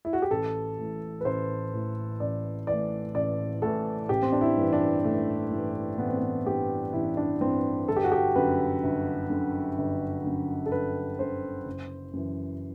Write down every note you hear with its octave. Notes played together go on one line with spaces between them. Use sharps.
E4
F#4
G4
A1 A4
A2 E3
B4
A1 C5
A2 E3
A1 D5
A2 E3 D5
A1 D5
A2 E3 A4
A1 G4
C4
D4
E4
G2 E3
D4
A1 A3
G2 E3
A1 B3
C4
B3
G2 E3 G4
A1 E4
D4
G2 E3 C4
G1 A4
G4
F#4
G4
F#2 D3 B4
G1
F#2 D3
G1
F#2 D3
A4
G1 B4
F#2 D3 C5
F#1
F#2 E3